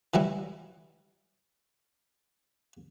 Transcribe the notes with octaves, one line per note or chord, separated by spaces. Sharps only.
E3 F#3 G3 E4